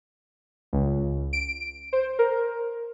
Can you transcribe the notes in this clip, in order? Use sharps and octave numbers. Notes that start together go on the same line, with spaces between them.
C#2
D7
C5
A#4